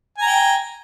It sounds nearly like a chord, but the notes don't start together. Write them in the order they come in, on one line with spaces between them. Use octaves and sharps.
G#5 A#5 G5